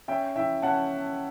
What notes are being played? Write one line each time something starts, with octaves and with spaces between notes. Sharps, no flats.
C#4 E5 G5
E4 E5 G5
C#4 F#5 A5